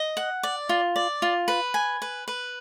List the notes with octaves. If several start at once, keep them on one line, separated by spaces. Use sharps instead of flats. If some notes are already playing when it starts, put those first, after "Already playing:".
Already playing: D#5
F#5
D5
F4
D5
F4
B4
G#5
B4
B4